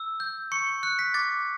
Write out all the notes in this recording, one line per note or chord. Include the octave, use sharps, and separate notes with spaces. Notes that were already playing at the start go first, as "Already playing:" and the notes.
Already playing: E6
G6
C#6 C#7
F#6 C#7
B6
D6 A6